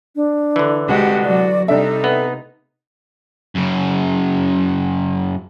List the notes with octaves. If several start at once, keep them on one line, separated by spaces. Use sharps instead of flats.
D4
D3 E3
C2 G#3 F#4 G4 F#5
F#3 F#4 D5
C3 G3 D4 D#4 A4 E5
B3
F#2 C#3